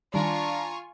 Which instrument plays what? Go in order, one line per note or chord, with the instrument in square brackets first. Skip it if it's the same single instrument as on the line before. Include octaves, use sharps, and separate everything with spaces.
[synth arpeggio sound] D#3 G3 [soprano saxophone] D4 [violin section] F4 G#5 C#6 [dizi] A#5